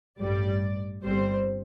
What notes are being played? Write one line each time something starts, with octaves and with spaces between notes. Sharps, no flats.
A1 G2 G3 D5
G1 G2 G3 C4 C5